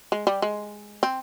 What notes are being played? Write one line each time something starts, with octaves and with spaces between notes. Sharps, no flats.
G#3
G3
G#3
C4